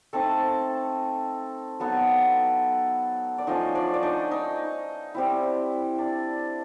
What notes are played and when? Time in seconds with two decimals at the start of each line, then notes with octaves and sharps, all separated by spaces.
0.13 A3 C4 D#4 A4 A5
1.80 F#3 B3 D#4 A4 A5
3.38 D5
3.47 F3 A3 C#4 D#4 D#5
3.75 D4 D5
3.94 D5
4.03 D#4 D#5
4.31 D#4 D#5
5.14 G3 C4 E4
5.98 D4 D5